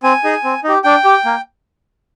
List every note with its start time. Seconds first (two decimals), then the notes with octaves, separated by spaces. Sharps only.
0.03 C4 G#5
0.24 D#4 G#4
0.44 C4
0.64 D#4 G4
0.84 D4 G5
1.05 G4
1.25 A#3